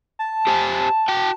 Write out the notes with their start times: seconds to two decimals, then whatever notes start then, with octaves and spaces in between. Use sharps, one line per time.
0.19 A5
0.47 G4 C5 G#5
1.08 F#4 G5